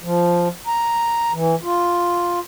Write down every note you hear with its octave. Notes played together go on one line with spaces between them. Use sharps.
F3
A#5
E3
F4